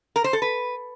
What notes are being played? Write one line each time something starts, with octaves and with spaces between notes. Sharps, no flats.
A#4
C5
A4
B4